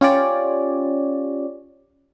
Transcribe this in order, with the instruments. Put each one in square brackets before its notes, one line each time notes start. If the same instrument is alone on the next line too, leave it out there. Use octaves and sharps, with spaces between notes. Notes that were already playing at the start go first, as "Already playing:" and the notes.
[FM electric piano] C#4 F4 G4 C#5 D5